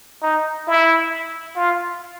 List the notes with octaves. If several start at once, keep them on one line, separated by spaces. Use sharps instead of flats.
D#4
E4
F4